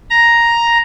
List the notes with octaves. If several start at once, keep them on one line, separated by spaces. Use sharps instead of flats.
A#5